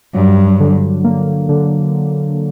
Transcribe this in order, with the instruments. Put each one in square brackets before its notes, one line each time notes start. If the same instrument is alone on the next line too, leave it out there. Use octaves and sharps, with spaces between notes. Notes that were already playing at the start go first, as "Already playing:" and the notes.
[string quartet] G2 [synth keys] F#3
[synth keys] D3
A#3
D3